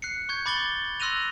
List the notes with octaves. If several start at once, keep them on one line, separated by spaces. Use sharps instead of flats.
F#6 C7 C#7
C#6 G6 G#6
B5 D6 A6 F#7 G7
C6 E6 F#6 A#6 D#7 F7